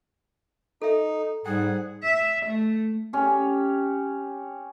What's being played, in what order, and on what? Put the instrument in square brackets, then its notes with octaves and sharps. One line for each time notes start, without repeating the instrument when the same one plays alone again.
[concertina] D#4 [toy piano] A4 E5
[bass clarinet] G#2 [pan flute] G3 [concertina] G#4 F#5 [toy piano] G5
[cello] E5
A3
[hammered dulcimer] C#4 G4